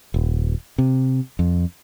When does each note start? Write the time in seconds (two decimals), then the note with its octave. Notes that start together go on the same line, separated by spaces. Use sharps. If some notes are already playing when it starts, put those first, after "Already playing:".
0.14 D#1
0.78 C3
1.39 F2